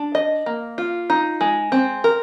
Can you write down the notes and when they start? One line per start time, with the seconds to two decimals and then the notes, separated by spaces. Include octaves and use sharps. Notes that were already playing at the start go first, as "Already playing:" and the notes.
Already playing: D4
0.15 D#5
0.46 A#3
0.78 F4
1.10 D#4
1.41 G#3
1.72 C4
2.04 A#4